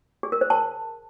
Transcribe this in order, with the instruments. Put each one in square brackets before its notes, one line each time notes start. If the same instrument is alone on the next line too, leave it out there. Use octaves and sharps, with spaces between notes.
[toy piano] G#4
A#4
C5
A5